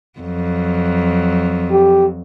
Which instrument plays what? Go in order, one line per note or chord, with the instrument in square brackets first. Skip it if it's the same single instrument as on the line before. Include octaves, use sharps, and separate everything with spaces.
[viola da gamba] F2 F#3
[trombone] G4